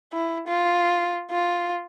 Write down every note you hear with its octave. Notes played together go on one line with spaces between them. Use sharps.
E4
F4
F4